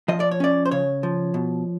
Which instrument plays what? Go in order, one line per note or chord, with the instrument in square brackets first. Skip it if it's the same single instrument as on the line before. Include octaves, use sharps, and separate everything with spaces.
[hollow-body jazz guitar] F3 D#5
D5
C#5
C#4 D5
C5
C#3 C#5
F3
B2